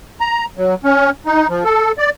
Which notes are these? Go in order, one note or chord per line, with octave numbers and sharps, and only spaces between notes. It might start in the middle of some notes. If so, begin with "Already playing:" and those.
A#5
F#3
C#4
D#4
F3
A4
D5